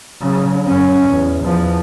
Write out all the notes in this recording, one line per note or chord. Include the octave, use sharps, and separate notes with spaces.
C#3 F#3
F#2 C#4
E2
E2 F3